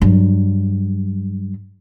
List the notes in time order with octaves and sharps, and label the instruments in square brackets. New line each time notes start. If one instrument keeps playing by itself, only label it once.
[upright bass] G2 F#3